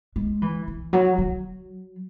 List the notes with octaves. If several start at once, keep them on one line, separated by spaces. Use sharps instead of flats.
G#3
E3
E3
F#3
F#3